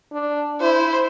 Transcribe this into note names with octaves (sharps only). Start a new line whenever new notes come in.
D4
E4 C5